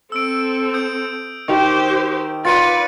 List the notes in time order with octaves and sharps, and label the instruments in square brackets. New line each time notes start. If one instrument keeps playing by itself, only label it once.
[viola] C4 A4 [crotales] E6 D7
[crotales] D#6 G6 D7
[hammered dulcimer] D#3 [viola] G4 C5
[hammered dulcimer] F4 [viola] B4 D5 [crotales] A6 C#7 D#7